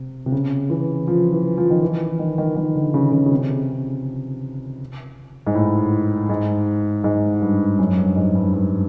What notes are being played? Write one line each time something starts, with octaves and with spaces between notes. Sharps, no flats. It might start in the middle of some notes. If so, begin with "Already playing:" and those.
Already playing: C3
C3
C#3
E3
F3
E3
F3
D#3
E3
D#3
D#3
D#3
D3
C#3
C#3
C#3
C3
G#2
A2
G#2
G#2
G2
F#2
G2
G#2
G2
G2